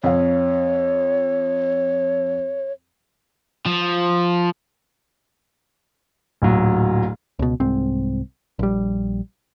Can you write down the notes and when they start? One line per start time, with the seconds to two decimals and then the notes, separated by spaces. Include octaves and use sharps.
0.04 F2 C#5 F5
3.66 F3
6.42 D1 A#2 F#3
7.39 C#2 B2
7.60 C2 G#2 C4
8.59 A#1 G3